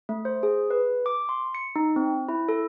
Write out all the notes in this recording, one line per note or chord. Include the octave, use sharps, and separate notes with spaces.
A3
C5
G#4
B4
D6
C6
C#7
D#4
C4
E4
A4